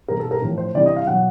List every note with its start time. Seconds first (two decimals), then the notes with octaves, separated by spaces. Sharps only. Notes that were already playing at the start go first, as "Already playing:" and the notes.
0.08 B2 G3 A#4
0.20 A4
0.31 A#4
0.42 A2 F3
0.58 C5
0.74 C3 E3 G3 D5
0.86 D#5
0.97 F5
1.07 B2 F#3 F#5